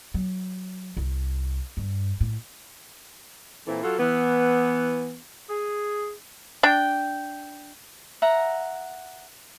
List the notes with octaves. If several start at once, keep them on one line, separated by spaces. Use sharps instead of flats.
F#3
C2
G2
A2
A#2 E3 C4 E4 A4
F#3 F4 F#4 A4
E3 B3
G#4
D4 G5
E5 F#5 A#5